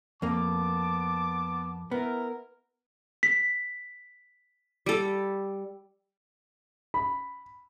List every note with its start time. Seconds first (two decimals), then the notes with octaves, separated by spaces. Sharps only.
0.22 F2 A#3 B3 A5 D6
1.91 B3 E4 A#4
3.23 B6
4.86 G3 A4
6.94 B5